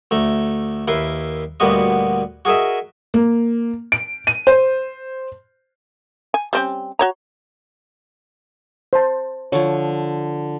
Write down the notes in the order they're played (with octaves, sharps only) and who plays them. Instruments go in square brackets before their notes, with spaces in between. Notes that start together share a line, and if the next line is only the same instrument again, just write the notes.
[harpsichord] D2 A3 A#5
D#2 E4 A#4 B4 C6
D2 A#2 G3 B3 F#4 D#5
F#4 G#4 A#4 D#5 E5
[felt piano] A#3
D7
D#7
C5
[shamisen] G#5
G3 C4 C#4
F#4 C#5 A#5
[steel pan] C5 A5
[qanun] D3 F3 [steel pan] C#5